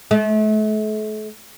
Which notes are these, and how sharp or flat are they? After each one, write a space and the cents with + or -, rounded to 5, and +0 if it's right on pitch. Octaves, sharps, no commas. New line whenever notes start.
A3 -40